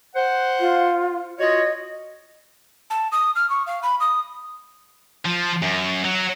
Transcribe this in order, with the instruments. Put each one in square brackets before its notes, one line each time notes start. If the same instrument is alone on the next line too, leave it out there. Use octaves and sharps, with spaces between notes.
[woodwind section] C5 F#5
[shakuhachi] F4
[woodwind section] F4 F#4 C#5 [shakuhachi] D#5
[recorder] A5
D#6
F6
C#6
F5
B5
D#6
[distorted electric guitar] F3
F#2
F#3